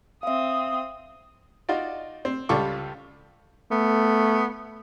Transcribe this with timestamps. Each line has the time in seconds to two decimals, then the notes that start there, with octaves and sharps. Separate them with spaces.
0.23 C4 E5 F5 D#6
1.69 D#4 F4 F#4 D5
2.25 C4
2.49 C#2 G3 F4 A4 C#6 D6
3.71 A3 B3